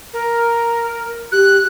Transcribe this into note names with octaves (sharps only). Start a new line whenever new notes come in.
A#4
G4 F#6